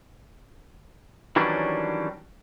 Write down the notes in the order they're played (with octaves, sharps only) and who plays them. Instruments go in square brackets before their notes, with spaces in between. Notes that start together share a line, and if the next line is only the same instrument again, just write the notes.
[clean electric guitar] D#3 E3 F#3 G3 C#4 D4